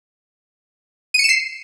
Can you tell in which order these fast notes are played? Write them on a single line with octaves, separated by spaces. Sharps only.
D#7 C#7 E7 C7